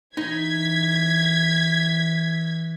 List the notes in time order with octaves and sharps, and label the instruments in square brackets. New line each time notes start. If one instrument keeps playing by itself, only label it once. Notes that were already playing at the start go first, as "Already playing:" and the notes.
[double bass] E3 [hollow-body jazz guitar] D#4 [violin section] G#6 B6